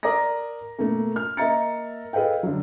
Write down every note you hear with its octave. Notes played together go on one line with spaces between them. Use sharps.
A#4 D5 A#5 D6 D#6 A#6
B2 A3 A#3
F6
A#3 D#5 E5 A#5 A6 C#7
G#4 A4 B4 D#5 F5 G5
D3 F#3